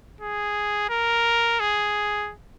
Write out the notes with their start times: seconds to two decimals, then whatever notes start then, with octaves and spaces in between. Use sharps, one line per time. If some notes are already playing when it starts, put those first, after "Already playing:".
0.21 G#4
0.90 A#4
1.60 G#4